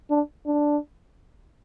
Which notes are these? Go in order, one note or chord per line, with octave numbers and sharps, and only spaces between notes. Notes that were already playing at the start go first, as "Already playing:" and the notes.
D4
D4